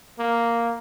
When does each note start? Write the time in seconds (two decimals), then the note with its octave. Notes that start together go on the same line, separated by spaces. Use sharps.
0.19 A#3